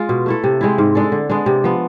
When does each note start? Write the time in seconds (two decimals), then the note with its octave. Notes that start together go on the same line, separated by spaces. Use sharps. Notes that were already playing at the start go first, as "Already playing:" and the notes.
Already playing: G#3 F4
0.09 B2
0.26 A3 E4 A4
0.44 C3
0.61 G#3 C4 E4
0.78 G#2
0.95 G#3 D4 A4
1.12 D3
1.30 G#3 B3 D4
1.46 C3
1.64 F3 B3